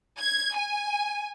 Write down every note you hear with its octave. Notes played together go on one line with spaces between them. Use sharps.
G#6
G#5